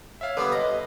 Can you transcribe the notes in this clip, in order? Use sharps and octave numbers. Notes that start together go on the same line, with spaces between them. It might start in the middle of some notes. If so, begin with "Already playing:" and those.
C#5 E5 F5
D3 G3 B3 B4
D#5 A#5